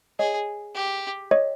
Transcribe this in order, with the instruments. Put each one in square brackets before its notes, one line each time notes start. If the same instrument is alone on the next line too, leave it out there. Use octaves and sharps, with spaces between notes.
[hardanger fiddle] G#4 [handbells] C#5 D#5
[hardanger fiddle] G4
[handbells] C#5 D#5